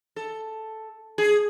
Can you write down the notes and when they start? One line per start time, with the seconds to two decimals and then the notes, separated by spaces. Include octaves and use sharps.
0.16 A4
1.18 G#4